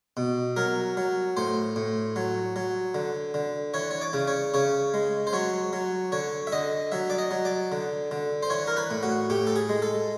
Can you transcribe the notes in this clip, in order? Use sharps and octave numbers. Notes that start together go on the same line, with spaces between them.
B2
F#3 A#4
F#3
A2 C5
A2
F#3
F#3
D3
D3
E3 C#5
C#5
D5
C#3
C#5
C#3 C#5
G#3
C5
F#3 C#5
F#3
D3 C#5
E5
D3 D#5
F#3 E5
D5
D#5
F#3
D5
D3
D3
C5
E3 C#5
A#4
B4
A2
F#4
A2 G4
A4
G#4
G#3
A4